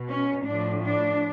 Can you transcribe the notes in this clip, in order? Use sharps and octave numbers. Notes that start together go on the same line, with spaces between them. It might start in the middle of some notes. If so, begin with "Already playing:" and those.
Already playing: B2
C#4
A2 F3 D4
D4